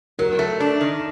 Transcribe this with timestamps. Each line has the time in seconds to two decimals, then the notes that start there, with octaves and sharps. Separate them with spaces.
0.19 F#3 A#4
0.39 A3
0.60 D4
0.81 D#3